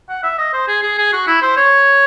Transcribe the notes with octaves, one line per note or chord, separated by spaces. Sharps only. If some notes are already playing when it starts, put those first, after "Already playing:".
F#5
E5
D#5
C5
G#4
G#4
G#4
F#4
E4
C5
C#5